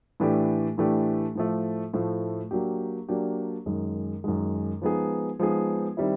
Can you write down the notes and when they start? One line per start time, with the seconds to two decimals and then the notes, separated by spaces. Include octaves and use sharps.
0.20 A2 E3 A3 D4 G4
0.78 A2 E3 A3 D4 G4
1.35 A2 F3 A3
1.94 A2 F3 A3
2.51 F#3 A#3 D4 G4
3.09 F#3 A#3 D4 G4
3.66 F#2 D#3 G#3
4.24 F#2 D#3 G#3
4.82 F3 G#3 B3 D#4 G#4
5.39 F3 G#3 B3 D#4 G#4
5.97 D#3 G3 C4 E4